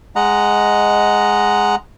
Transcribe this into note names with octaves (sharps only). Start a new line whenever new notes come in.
G#3 D#5 F#5 A#5